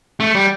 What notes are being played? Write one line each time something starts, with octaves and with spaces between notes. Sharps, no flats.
A3
G3